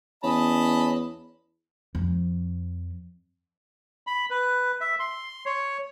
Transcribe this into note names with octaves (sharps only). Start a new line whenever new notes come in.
E2 C#4 D#5 A5 B5
F2
B5
B4
E5
C6
C#5